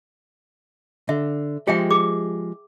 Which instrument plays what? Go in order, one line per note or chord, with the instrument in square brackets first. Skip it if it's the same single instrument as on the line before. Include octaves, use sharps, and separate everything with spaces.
[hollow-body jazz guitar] D3 [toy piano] E5
[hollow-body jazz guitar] F3 G#3 G4 [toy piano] G#4 E5 G5
[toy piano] G#4 D6